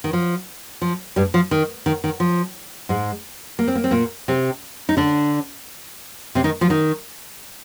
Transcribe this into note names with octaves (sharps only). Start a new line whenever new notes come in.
D#3
F3
F3
G2 G3
F3
D#3
D#3
D#3
F3
G#2 G#3
A#3
C4
A#3
C4
A#2 A#3
C3 C4
D#4
D3 D4
C3 C4
D#3 D#4
F3 F4
D#3 D#4